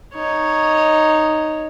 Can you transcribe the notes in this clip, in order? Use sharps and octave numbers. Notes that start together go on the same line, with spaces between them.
D#4 C#5